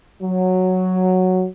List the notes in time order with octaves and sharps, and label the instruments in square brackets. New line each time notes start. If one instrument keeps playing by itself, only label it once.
[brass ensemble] F#3